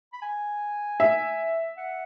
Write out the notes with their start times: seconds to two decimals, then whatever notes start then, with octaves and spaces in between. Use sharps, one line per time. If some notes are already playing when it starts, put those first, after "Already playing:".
0.13 B5
0.22 G#5
1.00 E5
1.78 F#5